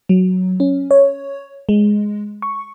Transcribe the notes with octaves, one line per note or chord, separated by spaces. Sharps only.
F#3
C#4
C#5
G#3
C#6